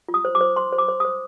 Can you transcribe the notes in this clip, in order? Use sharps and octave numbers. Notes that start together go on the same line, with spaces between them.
F4
D#6
C5
D6
C5
C5 C6
C5
D6
C5
C5 D#6